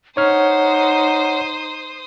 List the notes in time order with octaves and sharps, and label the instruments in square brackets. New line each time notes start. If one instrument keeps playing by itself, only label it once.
[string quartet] D#4 [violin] C5 D#6 [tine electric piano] C#5 F6 [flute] F#5